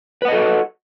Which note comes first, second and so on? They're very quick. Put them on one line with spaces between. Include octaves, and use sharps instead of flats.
B4 F#5 D#5 A4 F#4